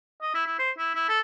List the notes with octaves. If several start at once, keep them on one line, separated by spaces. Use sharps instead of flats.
D#5
E4
E4
C5
E4
E4
A4